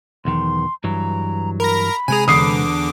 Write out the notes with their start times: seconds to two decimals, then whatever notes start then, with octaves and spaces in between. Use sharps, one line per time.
0.25 B1 E2 D#3 C6
0.84 G2 E3 F#3 A#5
1.60 A#4 B5 A#6
2.08 C3 G#3 G#4 G#5 A#5
2.28 E2 D3 D6 D#6 C7